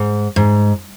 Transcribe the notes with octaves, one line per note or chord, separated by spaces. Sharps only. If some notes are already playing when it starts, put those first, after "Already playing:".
Already playing: G#2
G#2